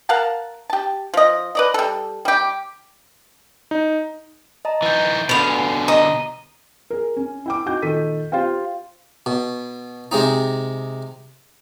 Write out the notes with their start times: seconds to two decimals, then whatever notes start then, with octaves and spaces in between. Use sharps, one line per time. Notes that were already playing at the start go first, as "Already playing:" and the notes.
0.09 A#4 F5 F#5 A5
0.70 G4 A5
1.14 F3 D#5
1.55 B4 D5 D#5
1.74 G3 A4
2.25 G3 G4
3.71 D#4
4.65 D#5 A5 A#5
4.82 E3 D#4 G6 A6
5.29 B2 D3 B3 F5
5.49 G#5
5.88 D#5 A#5
6.90 G#4 A#4
7.17 C#4
7.46 E4 G5 D6
7.66 D#4 F#4 G5 D6 G6
7.82 A#2 D#3 A4 B6 D#7
8.32 F4 G4 C5 F5 G5
9.26 B2
10.11 C3 G#3 C4 D#4